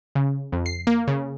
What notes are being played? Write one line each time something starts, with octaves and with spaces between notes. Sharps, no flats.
C#3
F2
C7
A#3
C#3